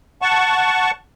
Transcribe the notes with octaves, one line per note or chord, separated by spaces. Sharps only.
F#5 A5 C#6